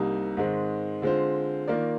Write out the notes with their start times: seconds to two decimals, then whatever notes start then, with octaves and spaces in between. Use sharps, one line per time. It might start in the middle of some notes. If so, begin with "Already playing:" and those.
Already playing: C2 C3 G3 A#3 D#4
0.37 G#2 D#3 G#3 C4
1.02 D3 G#3 C4 F4 C5
1.68 D#3 A#3 F4 A#4 D5